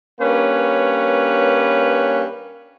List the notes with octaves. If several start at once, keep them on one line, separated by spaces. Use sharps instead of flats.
G2 A#3 C#4 B4 C#5